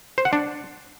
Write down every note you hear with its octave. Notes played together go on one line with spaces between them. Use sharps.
C5
F#5
D4